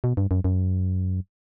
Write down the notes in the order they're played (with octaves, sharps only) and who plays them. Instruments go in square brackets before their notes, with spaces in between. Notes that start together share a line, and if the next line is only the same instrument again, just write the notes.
[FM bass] B2
G2
F#2
F#2